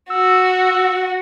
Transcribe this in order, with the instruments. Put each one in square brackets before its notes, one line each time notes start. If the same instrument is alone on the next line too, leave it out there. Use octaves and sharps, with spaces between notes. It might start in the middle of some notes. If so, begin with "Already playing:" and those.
[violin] F#4 [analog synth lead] E6